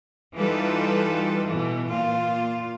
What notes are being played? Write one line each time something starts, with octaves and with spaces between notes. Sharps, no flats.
E3 G3 D#4 F4 A4 B4
B2 E3
A#2 F4